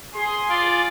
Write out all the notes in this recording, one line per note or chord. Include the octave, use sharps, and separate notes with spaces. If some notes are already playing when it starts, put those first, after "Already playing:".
G#4 C6
F4 D5